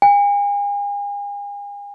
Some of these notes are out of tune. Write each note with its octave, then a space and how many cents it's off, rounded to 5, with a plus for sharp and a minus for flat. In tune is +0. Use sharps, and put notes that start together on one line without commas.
G#5 -40